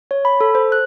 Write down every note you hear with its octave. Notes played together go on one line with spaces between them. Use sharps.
C#5
B5
A4
C5
F#6